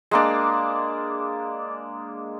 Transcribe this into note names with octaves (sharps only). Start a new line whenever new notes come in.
G#3 A#3 D4